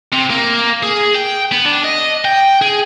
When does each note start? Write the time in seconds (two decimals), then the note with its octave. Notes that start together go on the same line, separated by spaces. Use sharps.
0.13 C3
0.30 A#3
0.83 G#4
1.14 G5
1.52 B3
1.65 D4
1.84 D#5
2.25 G5
2.62 G#4